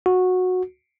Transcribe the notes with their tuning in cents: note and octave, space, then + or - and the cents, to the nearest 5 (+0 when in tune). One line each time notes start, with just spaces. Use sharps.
F#4 -15